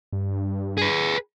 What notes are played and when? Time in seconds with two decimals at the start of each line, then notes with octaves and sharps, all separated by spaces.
0.12 G2
0.78 G#4 B4